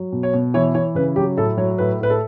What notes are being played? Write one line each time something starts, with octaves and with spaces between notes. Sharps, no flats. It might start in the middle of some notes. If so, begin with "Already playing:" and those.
Already playing: F#3
B2
C#5
B2
E3 C#5
E3 C#5
C#3 B4
F#3 G4
A2 A4
F#3 C#5
A2 B4
A2 B4
A4